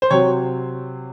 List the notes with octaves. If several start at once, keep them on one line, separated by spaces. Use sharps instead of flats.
C5
C3 F#3 C4 C#5